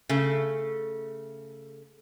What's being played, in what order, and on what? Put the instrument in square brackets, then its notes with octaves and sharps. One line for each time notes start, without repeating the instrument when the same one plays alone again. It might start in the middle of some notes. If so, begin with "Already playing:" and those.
[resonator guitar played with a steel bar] C#3 A3